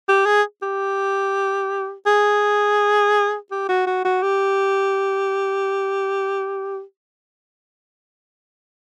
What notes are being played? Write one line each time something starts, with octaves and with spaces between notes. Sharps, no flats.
G4
G#4
G4
G#4
G4
F#4
F#4
F#4
G4